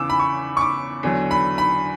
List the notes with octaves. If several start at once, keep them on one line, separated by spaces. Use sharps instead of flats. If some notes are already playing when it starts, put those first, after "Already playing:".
Already playing: E2 C#3 E3 D6 E6
B5
C#6
C#6
D6
E2 D3 F#3
B5
B5